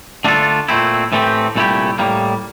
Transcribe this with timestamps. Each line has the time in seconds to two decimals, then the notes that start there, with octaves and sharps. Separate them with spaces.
0.25 D3 A3 D4 F4 A4
0.69 A#2 A3 C4 E4
1.12 A2 E3 A3 C4 G4
1.56 C2 A#2 A3 E4 G4
1.99 A2 G3 A#3